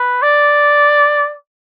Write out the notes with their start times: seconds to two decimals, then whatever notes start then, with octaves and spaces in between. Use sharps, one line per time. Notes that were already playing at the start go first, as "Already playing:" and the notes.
Already playing: B4
0.23 D5